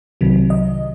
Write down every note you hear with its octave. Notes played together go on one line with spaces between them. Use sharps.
C2 C3 D#3 F#3
D#5